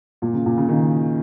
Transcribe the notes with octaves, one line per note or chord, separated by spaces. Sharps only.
A#2
C#3
A#2
C#3
D#3